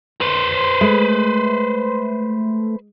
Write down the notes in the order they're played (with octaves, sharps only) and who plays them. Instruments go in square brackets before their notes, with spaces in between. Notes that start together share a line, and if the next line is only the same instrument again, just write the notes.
[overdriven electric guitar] B4 C5
[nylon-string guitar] G#3 [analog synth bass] A3